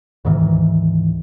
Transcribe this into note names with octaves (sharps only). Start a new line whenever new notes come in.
D2 G#2 D#3 E3